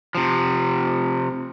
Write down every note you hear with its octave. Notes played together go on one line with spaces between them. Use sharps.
C3 F3